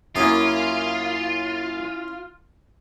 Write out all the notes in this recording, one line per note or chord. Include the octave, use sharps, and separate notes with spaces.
F#2 A#3 C#4 E4 F4 D#6